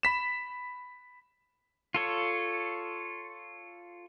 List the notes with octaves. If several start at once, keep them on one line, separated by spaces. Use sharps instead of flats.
B5 B6 E7
F4 A4 C#5